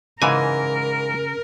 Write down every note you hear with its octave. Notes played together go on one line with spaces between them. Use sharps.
G#2 C#3 E3 A#4 G#5